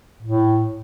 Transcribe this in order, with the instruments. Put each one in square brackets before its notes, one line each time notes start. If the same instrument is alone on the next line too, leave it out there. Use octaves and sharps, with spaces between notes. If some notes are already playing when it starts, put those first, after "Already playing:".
[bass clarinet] A2